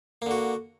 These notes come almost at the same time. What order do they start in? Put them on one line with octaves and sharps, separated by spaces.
A#3 D3 F#4